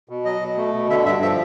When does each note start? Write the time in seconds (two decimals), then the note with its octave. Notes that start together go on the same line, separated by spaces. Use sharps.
0.09 B2
0.25 F#3 D#5
0.41 B2
0.57 A3
0.74 B2
0.89 D3 E5
1.05 G2 E5
1.22 F3 E5